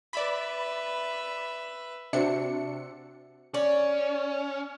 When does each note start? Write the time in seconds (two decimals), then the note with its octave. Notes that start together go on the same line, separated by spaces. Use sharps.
0.13 B4 D5 E5 B5
2.13 C3 D4 F#4 C5 E5 C#7
3.54 C#4 D5